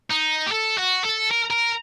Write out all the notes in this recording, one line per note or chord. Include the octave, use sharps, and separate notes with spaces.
D#4
G4
A4
F#4
A4
A#4
A#4